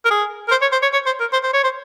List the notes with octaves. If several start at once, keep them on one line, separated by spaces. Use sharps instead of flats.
A#4
G#4
A#4
C5
C#5
C5
C#5
C#5
C5
A#4
C5
C5
C#5
C5